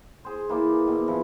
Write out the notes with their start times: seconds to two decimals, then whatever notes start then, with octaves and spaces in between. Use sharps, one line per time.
0.25 G#4 C5
0.49 E3 A#3 D5
0.88 B2
1.08 E3 F3 E4